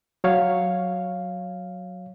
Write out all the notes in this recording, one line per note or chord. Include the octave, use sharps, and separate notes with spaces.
F#3 C#5 F5